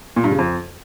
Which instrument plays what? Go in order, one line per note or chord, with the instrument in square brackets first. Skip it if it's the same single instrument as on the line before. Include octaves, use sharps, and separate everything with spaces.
[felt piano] A#2
G2
C#3
F2